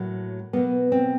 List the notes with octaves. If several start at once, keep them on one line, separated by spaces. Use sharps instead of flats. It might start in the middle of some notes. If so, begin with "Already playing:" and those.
Already playing: A2 F#3 A#3
B2 F#3 A#3 B3
C4